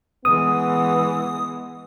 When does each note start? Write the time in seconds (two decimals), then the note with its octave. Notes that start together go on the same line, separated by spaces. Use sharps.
0.25 E3 G#3 B3 D#6